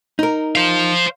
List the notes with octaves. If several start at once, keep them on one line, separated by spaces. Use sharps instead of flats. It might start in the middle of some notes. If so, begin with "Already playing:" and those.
D#4 A#4
C5 F5